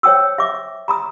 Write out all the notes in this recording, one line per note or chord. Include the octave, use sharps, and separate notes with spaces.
C5 C#5 G5 D#6 E6
E5 D6
A#5 B5 D#6